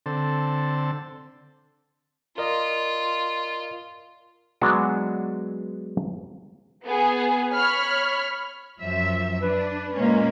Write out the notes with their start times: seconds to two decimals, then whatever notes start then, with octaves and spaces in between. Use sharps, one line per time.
0.06 D3 C4 A4
2.38 F4 A#4 D5 D#5
4.61 F#3 G#3 B3 D4 F#4
6.86 B3 G#4
7.53 C#5 B5 F6
8.79 F#2 F3 E5
9.42 D4 B4
9.95 A#2 G#3 A#3 C#4